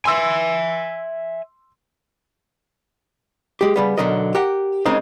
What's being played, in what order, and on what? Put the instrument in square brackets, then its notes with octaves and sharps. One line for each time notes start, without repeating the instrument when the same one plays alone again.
[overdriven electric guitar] E5 G#5 [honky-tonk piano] C6 E6
[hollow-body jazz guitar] G#3 G4
C#3 G3 B3
B1 B2 D3 F#3 A#4 D#5
G4 A#4 F#5
C#3 G#3 A#3 C4 D#4